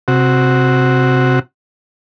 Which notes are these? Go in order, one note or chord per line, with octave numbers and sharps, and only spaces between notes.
C3 F#4